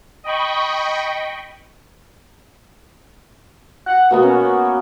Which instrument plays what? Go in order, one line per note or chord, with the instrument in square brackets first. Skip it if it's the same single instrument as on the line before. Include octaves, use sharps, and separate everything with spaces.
[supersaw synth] D#5 G5 B5 C#6
[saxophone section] F#5
[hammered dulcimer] B2 A#3 B3 [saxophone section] F#4
[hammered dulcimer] C#4